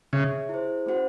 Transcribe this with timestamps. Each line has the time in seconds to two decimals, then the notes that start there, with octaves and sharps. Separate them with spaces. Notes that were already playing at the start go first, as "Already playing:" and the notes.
0.13 C#3 G#4 C#5 E5
0.49 E4 G#4 C5
0.86 A3 C#4 F#4 C5 F#5